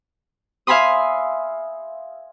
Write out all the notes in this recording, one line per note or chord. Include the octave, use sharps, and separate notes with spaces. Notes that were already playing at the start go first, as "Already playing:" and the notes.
E5 F5 G#5 B5 C6 D#6